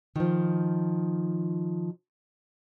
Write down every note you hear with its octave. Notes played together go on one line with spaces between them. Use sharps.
D#3 F3